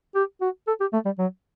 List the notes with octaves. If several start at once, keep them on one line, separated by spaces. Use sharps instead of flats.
G4
F#4
A4
G4
A3
G3
F#3